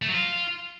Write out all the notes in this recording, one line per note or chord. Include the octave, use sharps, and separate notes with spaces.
A3
F#3
F4